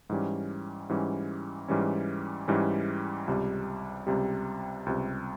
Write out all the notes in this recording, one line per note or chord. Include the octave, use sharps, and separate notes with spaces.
G#2 E3 G3 C#4
G#2 E3 G3 C#4
G#2 E3 G3 C#4
G#2 E3 G3 C#4
C#2 C3 G3
C#2 C3 G3
C#2 C3 G3